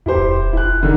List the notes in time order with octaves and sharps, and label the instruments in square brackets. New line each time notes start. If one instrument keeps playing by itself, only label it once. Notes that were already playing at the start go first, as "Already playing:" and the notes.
[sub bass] F2 [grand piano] E4 G4 C5
[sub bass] D#1
[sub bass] F1 [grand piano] E4 F#6
[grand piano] D3 D#3